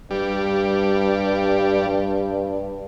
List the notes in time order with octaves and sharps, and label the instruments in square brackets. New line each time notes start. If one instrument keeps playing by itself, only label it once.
[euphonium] G2 [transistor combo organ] G3